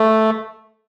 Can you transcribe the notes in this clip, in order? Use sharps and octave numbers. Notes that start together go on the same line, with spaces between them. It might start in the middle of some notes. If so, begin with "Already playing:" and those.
Already playing: A3